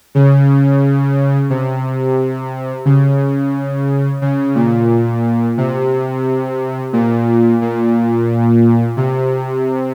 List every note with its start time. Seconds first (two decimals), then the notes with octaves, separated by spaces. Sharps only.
0.15 C#3
1.50 C3
2.85 C#3
4.22 C#3
4.55 A#2
5.57 C3
6.93 A#2
7.62 A#2
8.97 C3